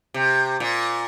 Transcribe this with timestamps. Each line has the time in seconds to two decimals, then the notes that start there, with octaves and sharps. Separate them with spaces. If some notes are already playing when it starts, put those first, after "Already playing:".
0.14 C3
0.60 A#2